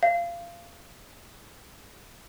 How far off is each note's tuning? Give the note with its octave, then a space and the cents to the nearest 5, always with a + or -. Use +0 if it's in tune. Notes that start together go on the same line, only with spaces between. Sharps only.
F5 -25